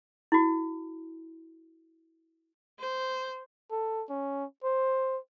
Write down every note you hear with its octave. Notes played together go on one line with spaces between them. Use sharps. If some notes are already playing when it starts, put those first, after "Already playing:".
E4 F#4
C5
A4
C#4
C5